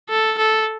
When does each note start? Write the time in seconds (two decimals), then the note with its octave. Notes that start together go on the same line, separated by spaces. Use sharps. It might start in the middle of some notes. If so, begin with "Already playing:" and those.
0.10 A4
0.38 A4